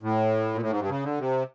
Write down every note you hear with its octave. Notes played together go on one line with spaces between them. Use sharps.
A2
A#2
A2
G#2
G2
C#3
D3
C3